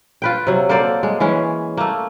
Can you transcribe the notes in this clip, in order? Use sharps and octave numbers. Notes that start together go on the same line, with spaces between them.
F4 B4 G5
C3 F#3
A#3 A4 C5 D5
G#3
E3 G#3 C#4
A3 A#3